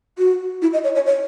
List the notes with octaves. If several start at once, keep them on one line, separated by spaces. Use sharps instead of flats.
F#4
E4
D#5
C#5
C#5
C#5